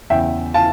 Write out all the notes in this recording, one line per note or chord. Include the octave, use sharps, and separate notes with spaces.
E2 C#3 E3 E5 G5
F5 A5